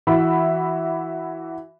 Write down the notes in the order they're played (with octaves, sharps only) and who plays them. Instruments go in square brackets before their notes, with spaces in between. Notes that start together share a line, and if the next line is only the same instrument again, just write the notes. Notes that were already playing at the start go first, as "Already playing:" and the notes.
[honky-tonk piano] E3 F#4 E5 B5